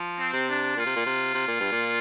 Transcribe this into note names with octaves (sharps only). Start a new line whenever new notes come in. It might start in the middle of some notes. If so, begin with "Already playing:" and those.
Already playing: F3
C4
C3
D4
A#2 F4
C3
A#2
C3
C3
A#2
G2
A#2